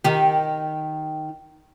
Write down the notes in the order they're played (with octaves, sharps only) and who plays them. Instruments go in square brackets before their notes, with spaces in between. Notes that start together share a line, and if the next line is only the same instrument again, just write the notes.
[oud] D#3 G4